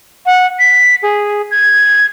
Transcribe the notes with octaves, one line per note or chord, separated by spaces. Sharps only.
F#5
B6
G#4
G#6